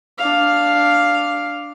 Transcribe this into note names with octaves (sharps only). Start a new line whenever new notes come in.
D4 F5